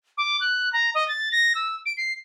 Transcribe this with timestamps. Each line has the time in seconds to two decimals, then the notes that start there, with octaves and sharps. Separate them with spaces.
0.18 D6
0.41 F#6
0.73 A#5
0.95 D#5
1.08 A6
1.32 A#6
1.55 E6
1.86 D7
1.97 C7